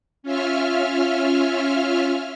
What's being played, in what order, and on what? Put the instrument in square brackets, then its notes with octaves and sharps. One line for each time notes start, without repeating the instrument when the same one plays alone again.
[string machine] C#4 F4 E5 F6